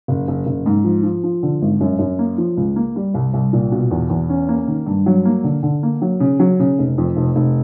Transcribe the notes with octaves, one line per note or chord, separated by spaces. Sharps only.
F#1
F#1
F#1
G#2
F3
F3
F3
D3
G#1
F#2
F#2
A#3
F3
C#2
A#3
G3
C2
C2
A#2
B2
E2
E2
C#4
A#3
D#3
G2
F#3
A#3
D3
D3
A#3
F#3
C#3
F#3
C#3
F1
F2
F1
F1